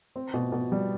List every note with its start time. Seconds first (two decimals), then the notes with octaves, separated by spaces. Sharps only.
0.16 C4
0.34 B2
0.52 B2
0.72 G3